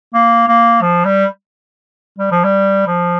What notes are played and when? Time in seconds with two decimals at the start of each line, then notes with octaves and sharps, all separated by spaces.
0.14 A#3
0.47 A#3
0.82 F3
1.05 G3
2.18 G3
2.31 F3
2.44 G3
2.87 F3